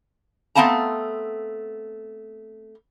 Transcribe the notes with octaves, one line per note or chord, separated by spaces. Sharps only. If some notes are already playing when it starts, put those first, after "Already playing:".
A3 B3 C4 F5 A5 A#5